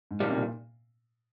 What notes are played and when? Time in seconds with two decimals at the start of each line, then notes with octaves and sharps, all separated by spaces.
0.11 G#2
0.20 F2 A#2 D#3 G3
0.31 C3
0.36 A#2